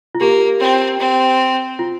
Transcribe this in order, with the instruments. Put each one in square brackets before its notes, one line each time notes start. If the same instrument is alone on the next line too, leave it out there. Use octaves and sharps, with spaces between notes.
[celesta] F4
[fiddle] A#3 [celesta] G4
[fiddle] C4
C4
[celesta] F4